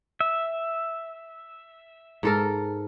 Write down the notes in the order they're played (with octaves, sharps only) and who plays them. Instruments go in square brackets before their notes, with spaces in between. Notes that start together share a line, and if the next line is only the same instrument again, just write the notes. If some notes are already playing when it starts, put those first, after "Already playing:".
[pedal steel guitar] E5
[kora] G#2 A4 A#4